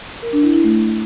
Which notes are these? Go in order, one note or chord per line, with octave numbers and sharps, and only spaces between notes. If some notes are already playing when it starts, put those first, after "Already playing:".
A#4
D4
E4
E4
A3